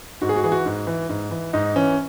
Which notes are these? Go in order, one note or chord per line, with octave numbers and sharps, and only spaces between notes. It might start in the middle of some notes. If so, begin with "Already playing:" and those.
G#2 F#4
G#4
F#4
E3 G#4
F#4
G#2
E3
G#2
E3
G#2 D#4
E3 C#4